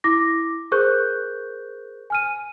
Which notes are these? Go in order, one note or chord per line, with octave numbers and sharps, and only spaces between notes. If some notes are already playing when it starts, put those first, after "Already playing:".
E4 D6 A#6
G#4 A#4 C5 C#6 F#6 G6
G#5 F6 D#7